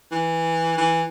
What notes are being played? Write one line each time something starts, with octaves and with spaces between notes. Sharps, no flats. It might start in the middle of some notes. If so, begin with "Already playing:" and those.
E3
E3